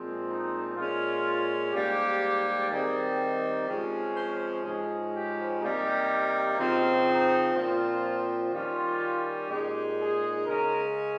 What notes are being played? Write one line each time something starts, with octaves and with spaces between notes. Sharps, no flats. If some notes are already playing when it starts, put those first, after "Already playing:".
Already playing: A#2 F3 G#3 C4
D#4
A#2 G#3 C#4 F4
G#2 G3 A#3 G4
D#3 G3 C4 D#4 G#4
C3 F3 G#3 C#4
C5
G#2 F3 G#3 C#4 G#4
G4
C3 G3 A#3 D#4 G4
C#3 F3 C4 D#4 F4
D#4
A#2 F3 C4 F4
D#3 G3 C#4 F4
A#2 G#3 D#4 G4
G#4
C#3 G#3 C#4 A#4